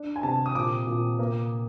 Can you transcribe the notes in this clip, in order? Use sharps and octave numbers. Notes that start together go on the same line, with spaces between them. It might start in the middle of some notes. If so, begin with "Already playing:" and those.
Already playing: D4
G#5
C3 A5
D#6
A#2 D6
A#2
A#3